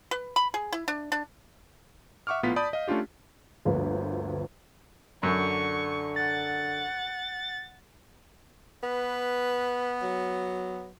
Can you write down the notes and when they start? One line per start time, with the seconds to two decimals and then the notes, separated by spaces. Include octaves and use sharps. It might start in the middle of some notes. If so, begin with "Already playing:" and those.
0.11 B4
0.36 B5
0.54 G#4
0.73 E4
0.88 D4
1.12 D4
2.27 E5 F#5 C#6 D6 F6
2.43 A#1 A2 B3 F4 B6
2.56 D5 A5 B5 D#6 G6
2.73 D#5 F5
2.88 A3 C#4 D4 F4 G4
3.65 G1 D2 F3 A#3 B4
5.23 F#2 D3 C#6
6.16 F#5 A6
8.83 B3 B4
10.02 F#3